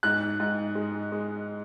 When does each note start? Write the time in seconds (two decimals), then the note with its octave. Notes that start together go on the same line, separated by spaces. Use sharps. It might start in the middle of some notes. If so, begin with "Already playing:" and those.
0.03 G#2 F#6
0.40 G#2
0.75 G#3
1.12 G#3